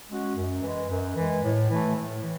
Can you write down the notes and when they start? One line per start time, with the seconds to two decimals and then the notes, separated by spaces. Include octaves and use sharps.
0.08 G#3 C#4 F#4
0.36 F#2
0.62 E3 G#3
0.89 F#2
1.16 E3 G#3
1.43 A2
1.69 E3 A3
1.95 A2
2.23 E3